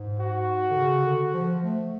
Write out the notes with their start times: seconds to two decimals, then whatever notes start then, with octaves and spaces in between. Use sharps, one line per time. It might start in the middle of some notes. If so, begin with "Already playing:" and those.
Already playing: G#2
0.20 F#4
0.71 D3
0.76 C#3
1.05 D3
1.34 F3
1.63 A3